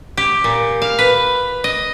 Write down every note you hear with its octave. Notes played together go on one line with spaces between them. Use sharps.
G4
A#2
F5
B4
D#5